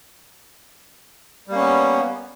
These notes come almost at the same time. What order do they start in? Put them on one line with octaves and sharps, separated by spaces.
G3 A#3 C#4 B3